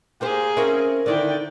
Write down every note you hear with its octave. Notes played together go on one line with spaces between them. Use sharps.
A#3 G4 G#4 A#4 C5
C4 C#4 E4 A#4
D3 D#3 E4 D5 G5